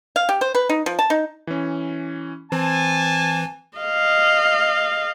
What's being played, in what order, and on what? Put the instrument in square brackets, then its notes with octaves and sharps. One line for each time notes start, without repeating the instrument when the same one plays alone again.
[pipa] F5
G4
C5
B4
D#4
F3
A5
D#4
[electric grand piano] E3 C#4
[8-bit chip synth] E3 [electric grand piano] C4 [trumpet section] G#5 A5
[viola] D#5 F5